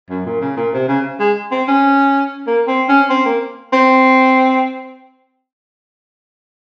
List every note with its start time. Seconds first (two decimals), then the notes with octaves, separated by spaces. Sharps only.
0.09 F#2
0.25 A#2
0.41 C#3
0.57 A#2
0.73 C3
0.88 C#3
1.20 G#3
1.51 C4
1.68 C#4
2.47 A#3
2.67 C4
2.88 C#4
3.10 C4
3.25 A#3
3.73 C4